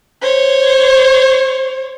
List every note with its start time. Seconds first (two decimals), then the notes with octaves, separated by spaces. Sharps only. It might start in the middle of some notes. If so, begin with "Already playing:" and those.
0.22 C5 C#5